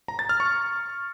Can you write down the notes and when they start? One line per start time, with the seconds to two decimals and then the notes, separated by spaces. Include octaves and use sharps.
0.08 A#5
0.19 A6
0.29 F6
0.40 C#6